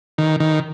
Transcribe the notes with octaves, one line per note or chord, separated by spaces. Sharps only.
D#3
D#3